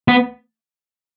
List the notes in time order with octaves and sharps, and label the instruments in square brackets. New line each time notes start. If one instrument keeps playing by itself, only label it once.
[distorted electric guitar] B3